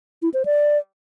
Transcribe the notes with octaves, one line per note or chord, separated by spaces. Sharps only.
E4
C5
D5